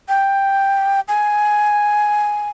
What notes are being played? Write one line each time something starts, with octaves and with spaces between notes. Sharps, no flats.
G5
G#5